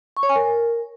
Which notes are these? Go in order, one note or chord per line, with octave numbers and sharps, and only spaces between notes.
C#6
C#5
G#5
A#4